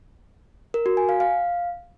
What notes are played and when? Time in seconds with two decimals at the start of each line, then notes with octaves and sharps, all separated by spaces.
0.74 A#4
0.86 F#4
0.97 G#5
1.09 F5
1.20 F5